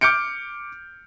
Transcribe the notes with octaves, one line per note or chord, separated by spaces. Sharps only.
D6 F6 G6 C#7 D7